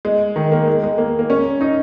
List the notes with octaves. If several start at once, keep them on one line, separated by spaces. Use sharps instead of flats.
G#3
D#3
A#3
G#3
G#3
A#3
A#3
C#4
D#4